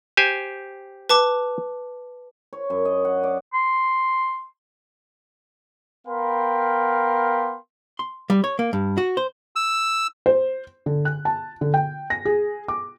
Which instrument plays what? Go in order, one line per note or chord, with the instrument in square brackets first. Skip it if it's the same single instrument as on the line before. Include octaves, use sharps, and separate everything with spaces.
[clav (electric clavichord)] G4 C5 G#5
[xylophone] B4 A5 D6
[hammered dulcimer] C#5
F#2
D#5
F#5
D5
[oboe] C6
[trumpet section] B3 A#4 F5 G5 B5 C6
[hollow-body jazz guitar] C6
G3
C#5
A#3
G2
F#4
C5
[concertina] E6
[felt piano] C5
D3
F#6
A5
D3
G5
A#6
G#4
D6